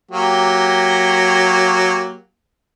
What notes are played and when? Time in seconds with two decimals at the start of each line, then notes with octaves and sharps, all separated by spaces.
0.11 F#3 A#3 G4